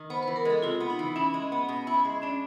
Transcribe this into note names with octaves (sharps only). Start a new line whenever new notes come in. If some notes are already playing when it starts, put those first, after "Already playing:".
Already playing: D#3
B3 C5
E3 B4
A#4
G#3
A4
C3 F4
B3
D#4
E3
C#4 E4
G#3
B3
B2
E4
G#3
C#4 D4